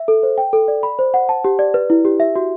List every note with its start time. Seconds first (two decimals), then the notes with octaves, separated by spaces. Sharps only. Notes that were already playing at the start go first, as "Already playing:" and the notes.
Already playing: E5
0.08 A4
0.23 C5
0.38 G5
0.53 A4
0.68 D5
0.83 B5
0.99 C5
1.14 F#5
1.29 A5
1.45 G4
1.59 D5
1.74 B4
1.90 E4
2.05 G4
2.20 E5
2.36 F#4